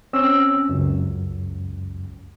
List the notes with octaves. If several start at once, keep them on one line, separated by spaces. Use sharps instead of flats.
C4 C#4 E6
C#2 F#2